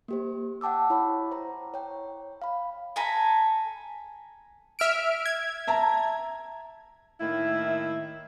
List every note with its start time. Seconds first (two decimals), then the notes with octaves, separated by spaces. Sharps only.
0.08 A#3 G4 C5
0.61 F#5 G5 A5 D6 E6
0.90 E4 C#5 B5
1.31 C5 A#5
1.74 C#5 G5
2.42 F5 B5
2.96 A4 G#5 A#5 B5
4.79 E5 F6 D7
5.26 G#6
5.67 E5 A5 A#5
7.21 A2 D#3 A#3 E4